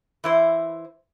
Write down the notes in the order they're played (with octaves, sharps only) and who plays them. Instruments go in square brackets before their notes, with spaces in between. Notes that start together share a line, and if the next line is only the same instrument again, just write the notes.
[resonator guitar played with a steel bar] E3 E4 C5